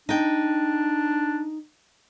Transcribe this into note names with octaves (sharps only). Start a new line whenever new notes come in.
D4 D#4 G5